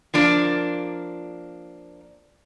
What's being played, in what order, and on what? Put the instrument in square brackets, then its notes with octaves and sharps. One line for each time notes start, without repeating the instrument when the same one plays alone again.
[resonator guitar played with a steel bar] F3 A#3 D4